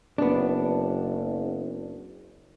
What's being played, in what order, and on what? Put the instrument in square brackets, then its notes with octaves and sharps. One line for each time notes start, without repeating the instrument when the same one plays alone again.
[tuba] F#1 [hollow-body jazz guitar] B3 D4